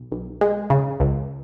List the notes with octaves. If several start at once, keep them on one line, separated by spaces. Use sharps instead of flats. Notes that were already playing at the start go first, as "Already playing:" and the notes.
Already playing: B1
B1
G#3
C#3
C#2